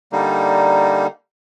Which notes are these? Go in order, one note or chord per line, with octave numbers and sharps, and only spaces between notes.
D3 G3 A#3 D#4